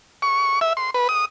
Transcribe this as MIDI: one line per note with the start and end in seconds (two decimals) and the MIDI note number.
0.22 0.60 85
0.61 0.73 76
0.77 0.90 84
0.94 1.08 71
1.09 1.25 87